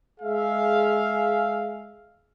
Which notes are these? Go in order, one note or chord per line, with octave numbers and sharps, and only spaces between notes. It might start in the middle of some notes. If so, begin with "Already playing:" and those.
G#3 G#4 E5 F5